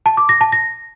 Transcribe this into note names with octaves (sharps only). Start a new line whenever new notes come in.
A5
D6
A#6
A5
A#6